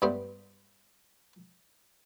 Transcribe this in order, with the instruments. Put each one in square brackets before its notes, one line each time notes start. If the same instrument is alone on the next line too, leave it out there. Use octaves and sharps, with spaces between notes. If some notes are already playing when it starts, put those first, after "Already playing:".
[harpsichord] G2 G3 A3 B3 C5